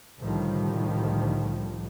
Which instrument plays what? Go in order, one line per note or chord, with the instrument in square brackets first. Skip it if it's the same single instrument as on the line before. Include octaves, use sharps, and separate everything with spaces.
[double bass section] C2 A2 D3 D#3 F3 G3